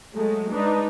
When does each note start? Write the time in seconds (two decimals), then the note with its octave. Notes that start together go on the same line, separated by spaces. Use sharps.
0.15 F#3 G#3 A3
0.53 G#3 D4 D#4 B4